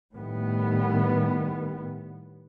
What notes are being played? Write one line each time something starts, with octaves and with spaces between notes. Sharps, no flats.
A2 D#3 G3 B3